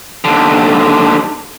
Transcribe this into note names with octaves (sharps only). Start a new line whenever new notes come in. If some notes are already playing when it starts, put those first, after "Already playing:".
D#2 D3